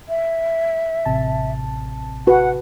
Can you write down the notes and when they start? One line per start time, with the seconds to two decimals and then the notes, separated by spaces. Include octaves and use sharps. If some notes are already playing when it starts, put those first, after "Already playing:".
0.09 E5
1.05 A1 C3 A5
2.27 F#4 B4 F#5